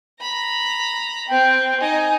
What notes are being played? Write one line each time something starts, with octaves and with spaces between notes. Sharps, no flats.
A#5 B5
C4 G5
D#4 G#5